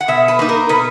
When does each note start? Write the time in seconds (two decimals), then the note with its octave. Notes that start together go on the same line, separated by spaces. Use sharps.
0.01 F#5
0.08 B2 E5
0.28 B4
0.39 A#3 D#4
0.49 A#4
0.69 B2 B4